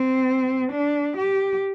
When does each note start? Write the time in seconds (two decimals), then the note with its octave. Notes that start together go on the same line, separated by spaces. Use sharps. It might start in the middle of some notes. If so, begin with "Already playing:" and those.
Already playing: C4
0.72 D4
1.17 G4